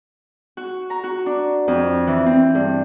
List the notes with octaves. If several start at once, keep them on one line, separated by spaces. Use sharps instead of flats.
F#4
A#5
F#4
D4
F2
E3
C4
G2